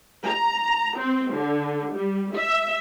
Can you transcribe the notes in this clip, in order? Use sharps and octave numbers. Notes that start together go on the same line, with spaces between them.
A#5
C4
D3
G3
E5